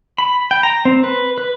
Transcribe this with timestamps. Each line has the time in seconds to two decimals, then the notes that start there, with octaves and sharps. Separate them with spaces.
0.18 B5
0.51 G5
0.63 A#5
0.85 C4
1.04 B4
1.38 B4